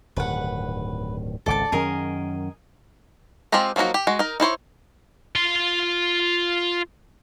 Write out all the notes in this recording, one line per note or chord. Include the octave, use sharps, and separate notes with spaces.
D1 G2 D#3 B4 F#5
G#1 C#2 D3 A4 D5 A5
F#2 D#3 C#4 G#4 A#4 D#5
G#3 C4 F4 G4 A#5
F3 F#3 A#3 D#4 F#4
G4
G#3 F#4
D#4 A#4
D#4 E4 C5 C#5
F4 C6